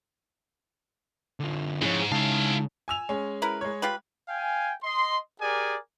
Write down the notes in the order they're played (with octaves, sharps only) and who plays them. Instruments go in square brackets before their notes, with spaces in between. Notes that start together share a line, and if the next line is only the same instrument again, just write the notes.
[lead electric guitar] D3 F4
[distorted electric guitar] G#2 [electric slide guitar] F3 C#4 E4 [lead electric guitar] G#4 C#5
[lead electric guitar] C#3 [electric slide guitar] G#3 D#4 A5 [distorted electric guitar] E4 F5
[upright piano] G#5 E6 F7
G#3 C#4
[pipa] E4 A#4 B4
[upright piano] G#3 C#5
[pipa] F4 G4 B4
[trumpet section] F5 G5 G#5
D#5 C6
G4 G#4 A#4 D5 G#5